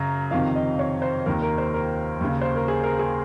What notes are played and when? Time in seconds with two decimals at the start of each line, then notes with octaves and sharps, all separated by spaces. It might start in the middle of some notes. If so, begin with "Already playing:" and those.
Already playing: F#2 C#3 A#5
0.31 F2 C3 D#3 F5
0.55 D#5
0.79 C#5
1.02 C5
1.26 D#2 D#3 A#4
1.42 A#4
1.58 C5
1.74 A#4
2.21 D#2 C#3
2.41 C5
2.55 A#4
2.68 G#4
2.83 A#4
2.99 G#4